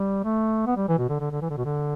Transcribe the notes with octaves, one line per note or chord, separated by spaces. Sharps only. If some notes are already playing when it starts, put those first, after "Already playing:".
Already playing: G3
A3
B3
G3
E3
B2
D3
D3
D3
E3
D3
B2
D3